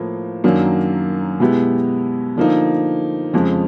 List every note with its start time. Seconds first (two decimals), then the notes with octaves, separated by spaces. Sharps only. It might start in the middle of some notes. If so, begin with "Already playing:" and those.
Already playing: A2 F3 A#3
0.44 F#2 D#3 F#3 A#3 D4
1.40 B2 G#3 B3 E4 G4
2.36 D3 F3 A#3 D#4
3.33 F2 C#3 F3 G#3